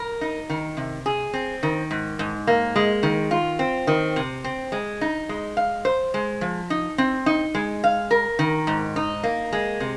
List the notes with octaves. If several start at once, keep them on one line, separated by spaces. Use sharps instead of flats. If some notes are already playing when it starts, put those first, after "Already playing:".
Already playing: A#4
D#4
D#3
C3
G#4
C4
D#3
G#2
G#2
A#3
G#3
D#3
F4
C4
D#3
C3
C4
G#3
D#4
G#3
F5
C5
G#3
F3
D#4
C4
D#4
G#3
F5
A#4
D#3
G#2
D#4
A#3
G#3
C3